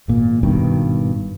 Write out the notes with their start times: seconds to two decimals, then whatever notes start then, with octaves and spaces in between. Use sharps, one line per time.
0.08 G#1 A#2
0.43 G#1 G2 B2 D#3